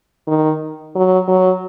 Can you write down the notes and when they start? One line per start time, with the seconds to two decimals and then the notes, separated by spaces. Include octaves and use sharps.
0.27 D#3
0.95 F#3
1.28 F#3